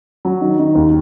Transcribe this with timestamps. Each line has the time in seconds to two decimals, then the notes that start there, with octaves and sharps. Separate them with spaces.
0.25 F#3
0.41 D#3
0.59 D#3
0.75 D#2